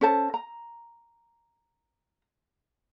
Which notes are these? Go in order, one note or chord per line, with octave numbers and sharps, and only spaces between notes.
C#4 A4 C5 A5
A#5